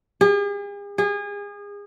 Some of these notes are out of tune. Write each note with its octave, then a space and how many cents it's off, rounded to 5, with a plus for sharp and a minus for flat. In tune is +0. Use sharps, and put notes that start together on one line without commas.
G#4 -45
G#4 -30